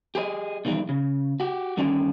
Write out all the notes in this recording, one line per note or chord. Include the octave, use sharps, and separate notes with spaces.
G4 G#4 B4 D#5
B2 D#3 E3 G3
C#3
F#4 G4
G2 D3 D#3 C#4 D5 G5